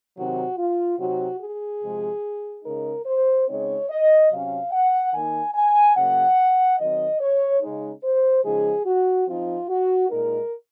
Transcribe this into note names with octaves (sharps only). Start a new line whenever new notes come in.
C3 D#3 F#3 C4 D#4 F#4
F4
C3 F#3 C4 D#4 F#4
G#4
C3 F3 G#3
C#3 G#3 D#4 A#4
C5
C#3 G#3 C4 D#4 C#5
D#5
C3 F#3 C#4 F5
F#5
D#3 A#3 D#4 G#5
G#5
C#3 F#3 A#3 F#5
D#3 F#3 C4 D#5
C#5
C#3 G#3 D#4
C5
C#3 F3 G#3 D#4 G#4
F#4
F3 C4 D#4 F4
F#4
A#2 G#3 D#4 A#4